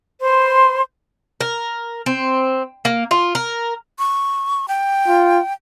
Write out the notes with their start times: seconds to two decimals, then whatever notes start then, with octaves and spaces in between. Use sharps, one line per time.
0.21 B4 C5 C6
1.41 A#4
2.06 C4
2.85 A#3
3.11 F4
3.35 A#4
3.99 C#6
4.68 G5
5.08 F4